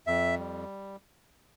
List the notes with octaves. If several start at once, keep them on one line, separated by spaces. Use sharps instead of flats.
F2 E5
G3